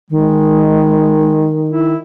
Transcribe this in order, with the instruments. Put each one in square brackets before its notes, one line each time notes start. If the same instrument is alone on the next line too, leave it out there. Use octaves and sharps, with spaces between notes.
[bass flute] D#3 [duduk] G#3
[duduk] E4